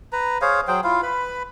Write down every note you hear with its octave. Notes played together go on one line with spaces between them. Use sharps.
B4 A#5
G#4 C5 C#5 F5
F#3 G#4 C5 G5
E4 F4 F5
B4 B5